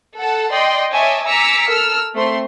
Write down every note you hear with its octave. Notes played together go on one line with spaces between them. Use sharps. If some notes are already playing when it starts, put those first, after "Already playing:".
A4 F#5 A5
D5 D#5 G5 C6
C#5 D#5 E5 G#5 A5 D6
G#5 A#5 D6 E6 B6 C#7
A4 A#4 E6 F6
A3 C4 C6